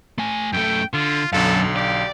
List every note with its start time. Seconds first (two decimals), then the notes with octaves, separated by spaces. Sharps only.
0.18 A3 G#5
0.53 F#2 A3 G5
0.93 D3 F4
1.33 B1 F#2 D3 A4 F5
1.76 G4 D5